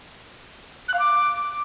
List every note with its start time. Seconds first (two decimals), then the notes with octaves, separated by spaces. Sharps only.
0.88 F#6
0.94 F5
0.99 D6